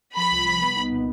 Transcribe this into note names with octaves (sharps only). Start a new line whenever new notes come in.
F3 B5
C2
C2
B3
D#4
A#2